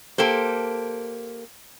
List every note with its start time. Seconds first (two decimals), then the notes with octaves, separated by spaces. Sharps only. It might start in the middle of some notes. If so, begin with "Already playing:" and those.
0.18 A#3 G4 A4 C5